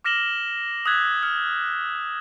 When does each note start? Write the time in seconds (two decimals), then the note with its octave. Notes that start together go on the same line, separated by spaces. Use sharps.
0.04 D6 F6 A#6 E7 F#7 G7
0.86 D#6 E6 F#6 G#6 A#6 B6
1.23 F6